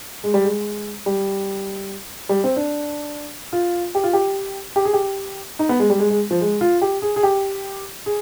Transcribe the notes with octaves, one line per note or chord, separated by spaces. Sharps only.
G#3
G3
G#3
G3
G3
C4
D4
F4
G4
F4
G4
G4
G#4
G4
D#4
B3
G#3
G3
G#3
G#3
F3
G#3
F4
G4
G#4
G#4
G4
G#4